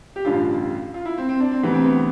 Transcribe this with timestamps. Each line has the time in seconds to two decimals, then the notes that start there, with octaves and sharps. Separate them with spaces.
0.16 G4
0.25 A1 G2 D3 F4
0.94 F4
1.05 E4
1.18 C4
1.29 C4
1.40 D4
1.51 C4
1.63 D2 C3 E3 B3
1.74 C4
1.84 B3